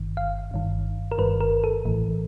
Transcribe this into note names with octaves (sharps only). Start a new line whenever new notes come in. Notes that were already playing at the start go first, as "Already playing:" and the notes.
Already playing: G1 G2 D#3
F5
G1 G2 D#3
A#4
G1 G2 D#3 B4
A#4
A4
A#1 A2 E3